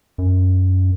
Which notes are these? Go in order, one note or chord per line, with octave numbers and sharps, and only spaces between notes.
F#2